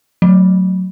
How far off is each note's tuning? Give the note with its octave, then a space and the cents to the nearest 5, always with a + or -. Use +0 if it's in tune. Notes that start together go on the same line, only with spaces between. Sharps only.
F#3 +0 A3 +10